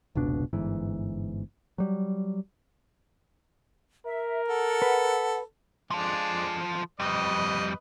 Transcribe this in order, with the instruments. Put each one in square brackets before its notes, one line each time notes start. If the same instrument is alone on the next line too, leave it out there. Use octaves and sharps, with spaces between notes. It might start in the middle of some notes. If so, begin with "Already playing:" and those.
[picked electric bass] F1 C#2 B2 D4
G1 G#2 E3
F#3 G3
[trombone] A#4 [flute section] E5
[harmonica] A4 [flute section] F#5
[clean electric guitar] B4
[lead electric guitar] F3 A4 [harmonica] G#3 D4
[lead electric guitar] F2 G3 [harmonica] B4 D#5